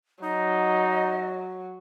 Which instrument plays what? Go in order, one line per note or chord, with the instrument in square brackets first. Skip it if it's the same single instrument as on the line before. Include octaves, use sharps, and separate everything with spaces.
[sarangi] F#3 [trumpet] D#4 [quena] D#5